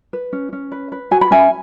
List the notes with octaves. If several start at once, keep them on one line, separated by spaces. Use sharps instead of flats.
B4
C#4
C#4
B4
B4
F#4 G#5
B5
C#4 E5 G#5